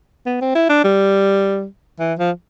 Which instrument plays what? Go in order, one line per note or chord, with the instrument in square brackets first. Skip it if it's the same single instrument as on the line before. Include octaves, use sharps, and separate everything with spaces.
[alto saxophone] B3
C4
E4
D4
G3
E3
F3